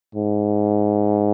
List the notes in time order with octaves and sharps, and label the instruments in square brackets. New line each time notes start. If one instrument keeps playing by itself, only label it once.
[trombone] G#2